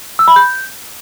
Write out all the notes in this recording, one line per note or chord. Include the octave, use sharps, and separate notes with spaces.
E6
B5
G6